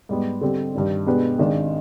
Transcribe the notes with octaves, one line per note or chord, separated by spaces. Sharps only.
G#2 G3 B3
D3 G3 C4 G4
G2 D#3 G3 D4
B2 G#3 D4 G4 B4
G#1 G#2 D#3 G#3 D4